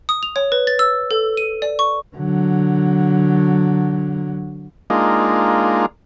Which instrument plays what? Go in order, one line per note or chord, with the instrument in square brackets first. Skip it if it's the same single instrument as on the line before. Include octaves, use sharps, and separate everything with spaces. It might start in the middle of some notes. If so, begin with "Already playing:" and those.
[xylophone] D#6
F7
C#5
B4
A6
E6
A4
D#7
D5
C#6
[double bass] D3 F#3
[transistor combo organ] G#3 A#3 D4 D#4 F4